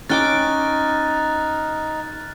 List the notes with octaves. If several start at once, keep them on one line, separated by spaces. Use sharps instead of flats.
C#4 D#4 G5 D6 F6 F#6 A6